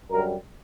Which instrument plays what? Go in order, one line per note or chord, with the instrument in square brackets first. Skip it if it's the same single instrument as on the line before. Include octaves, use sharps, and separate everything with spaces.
[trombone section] F#2 D3 G3 A#4